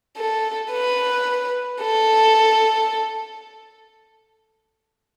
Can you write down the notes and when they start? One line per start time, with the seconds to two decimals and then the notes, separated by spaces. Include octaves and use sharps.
0.17 A4
0.72 B4
1.81 A4